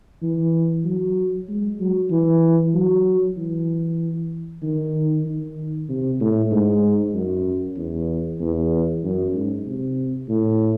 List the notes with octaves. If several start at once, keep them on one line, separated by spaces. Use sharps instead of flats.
E3
F#3
G#3
F#3
E3
F#3
E3
D#3
D#3
C3
A2
G#2
F#2
E2
E2
F#2
G#2
C3
A2